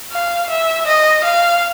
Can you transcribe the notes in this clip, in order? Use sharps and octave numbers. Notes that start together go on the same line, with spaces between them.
F5
E5
D#5
F5